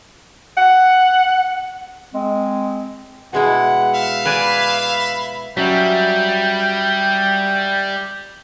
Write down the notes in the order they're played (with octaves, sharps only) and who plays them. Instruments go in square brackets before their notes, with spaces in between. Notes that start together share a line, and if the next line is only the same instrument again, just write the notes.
[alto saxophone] F#5
[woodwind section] G#3 C4
[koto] B2 G#3 E4 [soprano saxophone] F#5
[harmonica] E5 F5
[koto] B4 D5 G#5 [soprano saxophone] B5
[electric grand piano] F#3 C#4 [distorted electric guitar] G3 [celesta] E5 G6 B6 [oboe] G5